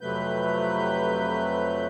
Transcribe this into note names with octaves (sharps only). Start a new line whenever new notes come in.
F2 C3 F#3 A3 B4 G6